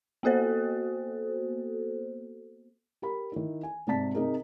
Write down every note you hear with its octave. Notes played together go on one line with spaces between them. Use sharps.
A#3 B3 F#4 A4 C5
G4 A#4 B5
D#3 E4
G#5
G#2 C3 D5 A5 B6
C3 D#4 G#4 A#4